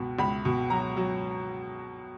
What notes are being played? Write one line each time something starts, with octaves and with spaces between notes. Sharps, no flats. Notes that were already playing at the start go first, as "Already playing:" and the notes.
Already playing: C#2 B2
C#2 B5
B2
F#3 A#5
F#3